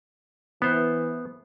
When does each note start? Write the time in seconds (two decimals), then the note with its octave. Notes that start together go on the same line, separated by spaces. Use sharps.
0.62 E3 B3 C5